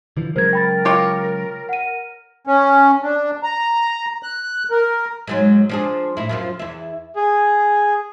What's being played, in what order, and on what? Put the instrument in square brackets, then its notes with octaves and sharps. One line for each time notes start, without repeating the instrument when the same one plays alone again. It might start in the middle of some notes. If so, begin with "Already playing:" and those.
[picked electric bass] D3 E3 F3
[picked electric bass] C#3 F#3 G#3 [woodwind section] A#4 [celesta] C5 G#6
[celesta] G5 B5 A6
[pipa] F4 G4 C#5
[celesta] F#5 D#7
[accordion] C#4
D4
A#5
F#6
A#4
[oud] G#2 F#3 G#3
F3 D4 G#4
A2 E4
F#2 F3 F4
E2 E4
[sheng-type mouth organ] G#4